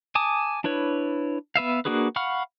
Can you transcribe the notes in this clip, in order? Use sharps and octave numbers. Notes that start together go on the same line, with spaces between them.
G#5 A5 D6 D#6
D4 E4 B4 C#5
B3 B4 E5 F5
A#3 D4 F#4 G#4 B4
F5 F#5 B5 C#6 F6